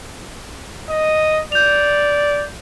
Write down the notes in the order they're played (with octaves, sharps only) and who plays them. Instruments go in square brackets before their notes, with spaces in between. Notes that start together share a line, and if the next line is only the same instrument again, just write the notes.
[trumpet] D#5
[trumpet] D5 [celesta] G6 F7